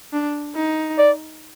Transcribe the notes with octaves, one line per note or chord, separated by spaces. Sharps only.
D4
D#4
D5